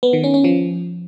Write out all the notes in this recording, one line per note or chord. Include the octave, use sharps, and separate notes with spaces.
B3
D#3
C#4
C#4
F3